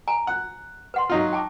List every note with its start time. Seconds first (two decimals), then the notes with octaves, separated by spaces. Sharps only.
0.08 G#5 A#5
0.27 F#5
0.94 B4 F#5 C6
1.10 F#3 D#4 F4
1.33 G5 A5 D6